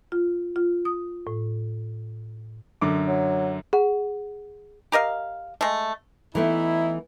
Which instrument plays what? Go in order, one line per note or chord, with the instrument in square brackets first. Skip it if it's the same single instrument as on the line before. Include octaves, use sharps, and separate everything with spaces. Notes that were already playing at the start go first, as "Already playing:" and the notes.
[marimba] F4
F4
D#6
A2
[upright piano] F#2 D3 D6
[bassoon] F#3
[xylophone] G#4 F#5
[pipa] G4 A#4 D#5 F5
G#3 A3
[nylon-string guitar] E3 A3 B3 [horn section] D#4 E4